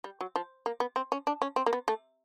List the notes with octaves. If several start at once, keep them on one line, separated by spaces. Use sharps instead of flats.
G3
F#3
F3
A#3
B3
C4
C#4
D4
C#4
C4
A#3
B3
A3